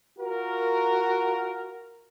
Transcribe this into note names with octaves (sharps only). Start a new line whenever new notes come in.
F4 F#4 A#4